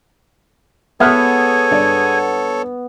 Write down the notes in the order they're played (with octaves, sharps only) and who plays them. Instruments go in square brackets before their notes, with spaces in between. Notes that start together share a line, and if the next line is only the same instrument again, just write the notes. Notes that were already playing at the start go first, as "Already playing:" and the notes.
[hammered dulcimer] B3 [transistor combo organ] G#4 [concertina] A4 C#5 [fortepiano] E5 F6 F#6
[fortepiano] G2 D5